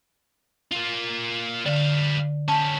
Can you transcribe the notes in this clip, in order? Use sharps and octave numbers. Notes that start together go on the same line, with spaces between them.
A#3 F4
D3 G3 F5
C#4 G4 A5